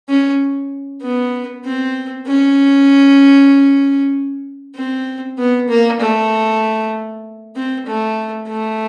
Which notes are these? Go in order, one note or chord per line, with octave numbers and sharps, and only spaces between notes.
C#4
B3
C4
C#4
C4
B3
A#3
A3
C4
A3
A3